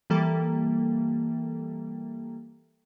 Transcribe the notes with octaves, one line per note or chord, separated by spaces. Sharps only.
E3 G3 A#3 A4